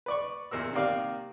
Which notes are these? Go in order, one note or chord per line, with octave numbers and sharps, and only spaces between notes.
B4 D5 C#6
E2 A#2 A#4 E6
C3 D#3 A#3 D5 F5